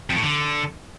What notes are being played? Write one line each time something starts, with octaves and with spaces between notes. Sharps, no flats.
F2
A2
D3